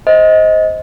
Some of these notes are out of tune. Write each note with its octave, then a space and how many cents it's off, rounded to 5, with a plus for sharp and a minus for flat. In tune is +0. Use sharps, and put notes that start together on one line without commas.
C5 +0 D#5 +20